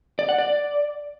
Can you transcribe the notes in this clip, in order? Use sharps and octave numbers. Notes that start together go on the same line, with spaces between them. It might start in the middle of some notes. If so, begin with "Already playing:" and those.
D5
F#5
D5